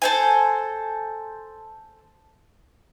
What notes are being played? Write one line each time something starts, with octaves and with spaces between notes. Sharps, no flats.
A4 C5 G#5